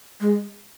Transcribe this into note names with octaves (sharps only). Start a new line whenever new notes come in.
G#3